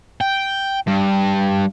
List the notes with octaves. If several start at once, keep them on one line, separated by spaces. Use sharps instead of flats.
G5
G2